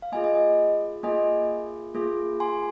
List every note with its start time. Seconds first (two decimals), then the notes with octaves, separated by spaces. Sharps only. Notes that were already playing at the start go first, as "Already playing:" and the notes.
0.02 F5
0.12 A#3 F4 G#4 D#5 G#5
0.24 D#5
0.35 D#5
1.03 A#3 F4 G#4 D#5 G#5
1.94 A#3 F4 G#4
2.40 G#5 C6